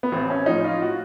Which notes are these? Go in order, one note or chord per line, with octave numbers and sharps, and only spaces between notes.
B3
A1 C4
C#4
A2 F3 D#4
F4
F#4